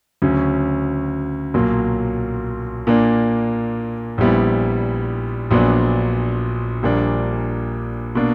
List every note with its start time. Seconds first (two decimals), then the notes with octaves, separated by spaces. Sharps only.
0.22 D2 C#3 F#3 C#4
1.54 B1 A#2 F#3 A#3
2.87 A#2 A#3 D4
4.18 A#1 A#2 G3 B3 E4
5.51 A#1 A#2 F#3 B3 D4
6.83 A#1 A#2 G3 A#3 D4
8.15 B2 A#3 D4